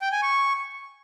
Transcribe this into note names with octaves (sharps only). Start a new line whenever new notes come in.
G5
G#5
C#6